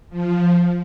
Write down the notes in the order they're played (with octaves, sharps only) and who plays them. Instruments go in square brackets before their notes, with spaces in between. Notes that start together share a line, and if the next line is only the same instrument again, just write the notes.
[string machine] F3